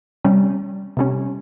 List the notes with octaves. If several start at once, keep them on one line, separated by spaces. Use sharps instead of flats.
C3 G3 C#4
C3 G3 C#4